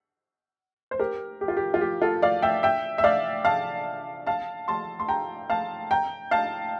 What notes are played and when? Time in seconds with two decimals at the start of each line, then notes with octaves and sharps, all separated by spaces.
0.91 C5
0.99 G4 A#4
1.41 G4
1.48 F4
1.57 G4
1.74 F4
1.81 G4
2.02 F4 A4
2.22 D5 F5
2.42 E5 G5
2.63 E5 G5
2.98 E5
3.04 D5 F5
3.45 F5 A5
4.27 F5 A5
4.68 A5 C6
5.00 C6
5.08 G5 A#5
5.50 F5 A5
5.91 G5 A#5
6.31 F5 A5